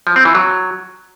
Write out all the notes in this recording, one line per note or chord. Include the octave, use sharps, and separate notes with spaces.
F3
C4
E3
F#3